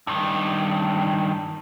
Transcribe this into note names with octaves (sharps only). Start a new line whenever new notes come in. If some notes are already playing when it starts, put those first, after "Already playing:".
G2 D#3